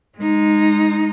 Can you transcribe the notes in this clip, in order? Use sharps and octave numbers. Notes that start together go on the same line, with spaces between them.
G#3 D#4